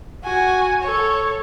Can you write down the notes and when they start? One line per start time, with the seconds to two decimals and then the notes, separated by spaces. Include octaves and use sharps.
0.23 F#4 G#5
0.81 A4 C#5